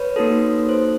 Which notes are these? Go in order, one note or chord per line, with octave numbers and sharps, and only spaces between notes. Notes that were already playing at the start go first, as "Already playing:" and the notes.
Already playing: B4 C#5
A#3 D#4 F#4 A4
C5